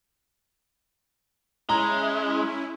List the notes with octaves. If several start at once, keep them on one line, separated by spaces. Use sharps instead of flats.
G#3 C#4 E4 A#5